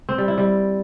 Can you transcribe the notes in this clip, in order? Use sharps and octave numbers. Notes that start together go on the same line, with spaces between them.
C4
G3
E4
G3